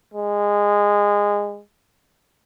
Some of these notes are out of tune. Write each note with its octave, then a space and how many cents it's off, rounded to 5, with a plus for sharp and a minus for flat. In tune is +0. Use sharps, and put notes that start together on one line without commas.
G#3 -20